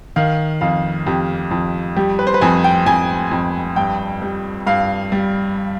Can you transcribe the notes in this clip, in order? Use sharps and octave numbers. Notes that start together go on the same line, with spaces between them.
D#3 F5
F2 F5
F2 G4
F2
G3 G4
B4
C5
B4
F2 G#5
G5
F2 G#5
F2
G2 G5
G3
G2 F5
G3